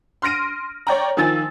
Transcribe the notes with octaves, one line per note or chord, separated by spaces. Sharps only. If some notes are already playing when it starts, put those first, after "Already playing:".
C6 F6 A#6 D7 D#7
C#5 D5 G5 A#5
D#3 F3 G#5 E6 A6